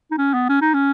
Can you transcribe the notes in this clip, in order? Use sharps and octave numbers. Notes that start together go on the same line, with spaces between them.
D#4
C#4
B3
C#4
D#4
C#4